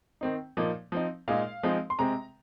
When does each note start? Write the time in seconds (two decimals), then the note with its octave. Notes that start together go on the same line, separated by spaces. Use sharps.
0.21 D#3 C4 D#4
0.57 A#2 F3 A#3 D#4
0.92 F3 C4 D#4
1.28 A#2 G#3 D#4 F5
1.63 F3 G#3 C4 D#4
1.90 C6
1.99 C3 G#3 C4 A#5